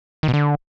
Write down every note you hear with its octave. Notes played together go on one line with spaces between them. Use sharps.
D#3
B2
D3